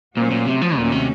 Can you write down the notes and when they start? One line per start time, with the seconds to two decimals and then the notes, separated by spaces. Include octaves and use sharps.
0.16 A#2 F#3 A3 C#4 F#4 C5
0.31 A#2
0.47 C3
0.61 F3
0.76 D#2 A#2 D#3 A3 C#4 F#4
0.92 C3